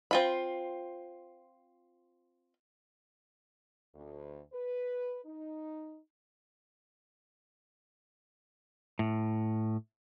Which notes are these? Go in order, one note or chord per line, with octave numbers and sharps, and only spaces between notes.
C4 F4 B5
D2
B4
D#4
A2